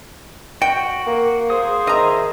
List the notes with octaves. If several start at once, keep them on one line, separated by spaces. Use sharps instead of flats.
F#4 G5
A#3
G#4 C5 D#6
D#3 D#5 E5 A#5 D#6